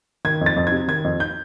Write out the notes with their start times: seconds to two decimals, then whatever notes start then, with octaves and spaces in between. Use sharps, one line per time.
0.25 D#3 G#6
0.41 F2
0.46 A6
0.56 F2
0.67 G#6
0.72 C3
0.88 D#3 G#6
1.04 F2
1.20 G6